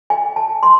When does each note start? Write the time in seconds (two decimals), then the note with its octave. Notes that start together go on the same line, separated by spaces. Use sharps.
0.10 G#5
0.36 A5
0.63 C6